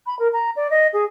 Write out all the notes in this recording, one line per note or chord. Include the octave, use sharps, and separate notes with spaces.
B5
A#4
A#5
D5
D#5
G#4